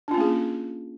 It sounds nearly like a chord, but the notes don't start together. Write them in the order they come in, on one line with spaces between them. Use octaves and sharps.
D4 F4 C#4 A#3 G#4